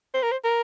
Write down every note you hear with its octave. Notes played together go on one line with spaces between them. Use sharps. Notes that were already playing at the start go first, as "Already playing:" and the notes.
C5
A#4
C5
A#4